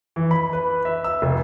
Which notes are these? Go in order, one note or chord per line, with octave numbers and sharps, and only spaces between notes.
E3
B5
B4
E5
E6
F1